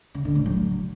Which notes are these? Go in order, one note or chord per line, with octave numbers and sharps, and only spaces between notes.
C#3
D3
A2
F#3